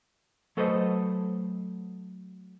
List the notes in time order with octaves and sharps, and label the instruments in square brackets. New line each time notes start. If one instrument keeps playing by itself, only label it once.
[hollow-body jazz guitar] F#3 A3 A4 B4 C5 D#5